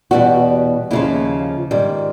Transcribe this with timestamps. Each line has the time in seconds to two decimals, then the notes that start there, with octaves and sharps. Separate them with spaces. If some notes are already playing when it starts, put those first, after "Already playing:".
0.11 E2 B2 G3 F#4
0.91 D#2 C#3 F3 E4
1.71 G#2 D#3 G3